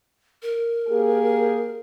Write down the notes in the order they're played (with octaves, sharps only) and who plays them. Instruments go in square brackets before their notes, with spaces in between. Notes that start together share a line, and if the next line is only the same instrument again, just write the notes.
[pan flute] A#4
[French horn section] A#3 G4 G#4